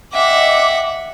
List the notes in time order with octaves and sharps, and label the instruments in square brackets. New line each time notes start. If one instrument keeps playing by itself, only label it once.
[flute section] D#5 G5 D6 [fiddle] E5 F#5